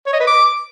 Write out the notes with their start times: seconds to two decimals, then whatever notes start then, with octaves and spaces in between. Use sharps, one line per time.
0.06 C#5
0.13 D#5
0.20 B4
0.27 D6